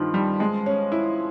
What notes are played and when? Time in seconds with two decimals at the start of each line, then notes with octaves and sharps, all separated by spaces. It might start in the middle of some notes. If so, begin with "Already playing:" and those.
Already playing: G2 D#3 F3
0.14 G3
0.40 G#3
0.66 C#4
0.92 E4